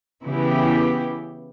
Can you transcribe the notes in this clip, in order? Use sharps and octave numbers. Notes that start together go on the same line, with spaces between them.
C#3 E3 B3 E4 G4